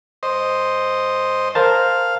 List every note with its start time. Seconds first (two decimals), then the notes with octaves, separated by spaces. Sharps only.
0.23 C5 D#5
1.55 A#4 C5 F5 A5